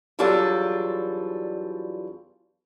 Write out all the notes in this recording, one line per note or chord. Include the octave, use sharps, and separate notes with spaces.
E2 F#3 G3 D4 F4 A4